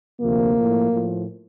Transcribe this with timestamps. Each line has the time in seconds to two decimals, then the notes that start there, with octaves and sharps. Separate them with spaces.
0.20 D2 C3 F3 A#3
0.55 A2 F3
0.89 A2 F3